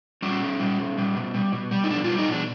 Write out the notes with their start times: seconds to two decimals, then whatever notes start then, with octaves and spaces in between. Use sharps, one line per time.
0.22 G3 C#4
0.41 B2
0.60 G3
0.78 B2
0.97 G3
1.16 B2
1.34 G3
1.52 B2
1.71 G3
1.84 D#4
1.89 B2 D4
2.04 G3 F4
2.18 D#4
2.27 B2 D4